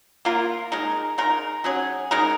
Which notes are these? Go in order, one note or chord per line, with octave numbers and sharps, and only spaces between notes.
A#3 F4 A#4
G#3 D#4 A#4
G#3 D#4 A#4
F#3 C#4 G#4
G#3 D#4 A#4